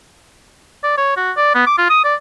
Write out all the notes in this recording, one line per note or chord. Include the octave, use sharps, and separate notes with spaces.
D5
C#5
F#4
D5
B3
D6
F4
D#6
D5